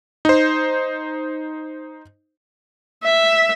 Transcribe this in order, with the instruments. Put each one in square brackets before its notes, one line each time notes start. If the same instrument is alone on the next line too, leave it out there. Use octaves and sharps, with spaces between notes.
[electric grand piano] D#4 C5
[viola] E5